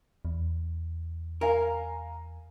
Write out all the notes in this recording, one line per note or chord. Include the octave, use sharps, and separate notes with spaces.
E2
A#4 F5 G#5 A#5